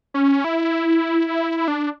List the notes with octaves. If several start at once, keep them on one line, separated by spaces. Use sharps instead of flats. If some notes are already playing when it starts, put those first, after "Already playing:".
C#4
E4
D4